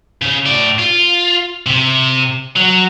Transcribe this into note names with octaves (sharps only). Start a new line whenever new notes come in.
C#3
A2 D5
F4
C3
F#3